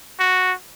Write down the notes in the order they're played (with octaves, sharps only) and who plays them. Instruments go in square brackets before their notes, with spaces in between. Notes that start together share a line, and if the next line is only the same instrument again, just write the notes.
[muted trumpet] F#4